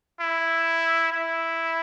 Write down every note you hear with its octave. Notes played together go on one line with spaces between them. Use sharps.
E4
E4